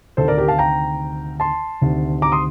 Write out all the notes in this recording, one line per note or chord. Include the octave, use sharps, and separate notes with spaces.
D2 C3 D#3 A4 C5
A#4 D5
G4 A#4
F5 A5
G5 A#5
A5 C6
D2 C3 D#3
A#5 D6
C6 D#6